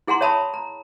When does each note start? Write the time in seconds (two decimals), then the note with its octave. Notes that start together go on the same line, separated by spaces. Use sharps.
0.07 E4 G#4 F#5 G#5 A#5 C6
0.21 C#5 E5 A5 B5 D#6
0.54 A#5